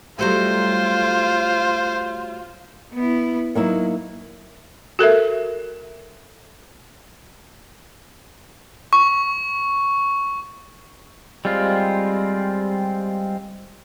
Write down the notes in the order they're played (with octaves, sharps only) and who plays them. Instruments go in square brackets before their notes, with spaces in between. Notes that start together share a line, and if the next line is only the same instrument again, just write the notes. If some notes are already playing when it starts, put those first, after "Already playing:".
[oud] F#3 G3 A3 [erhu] F4 [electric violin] C5
[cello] B3 E4
[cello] F#3 [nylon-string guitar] A#3 D#4 E4
[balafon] F#4 A4 A#4 E5
[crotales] C#6
[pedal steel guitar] G3 G#3 C4 F4